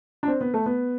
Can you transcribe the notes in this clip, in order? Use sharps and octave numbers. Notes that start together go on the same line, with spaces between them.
D4
C4
B3
A3
B3